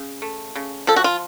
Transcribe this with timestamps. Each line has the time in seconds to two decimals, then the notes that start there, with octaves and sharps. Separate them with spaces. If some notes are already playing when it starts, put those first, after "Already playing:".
Already playing: C#3
0.22 A3
0.55 C#3
0.87 F3 A4
0.96 F#4
1.04 F4